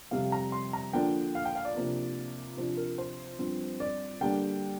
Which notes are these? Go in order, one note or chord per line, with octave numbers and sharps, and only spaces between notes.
F2 C3 G3 F5
A#5
C6
A#5
D3 F3 A#3 D4 G5
F5
G5
F5
D5
C3 F3 A#3 D4
C3 F3 D4 C5
A#4
C5
G2 F3 C4
D5
D3 G3 A#3 D4 G5